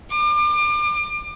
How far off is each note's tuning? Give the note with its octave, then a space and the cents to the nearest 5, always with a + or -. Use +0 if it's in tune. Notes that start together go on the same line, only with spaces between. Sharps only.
D6 +35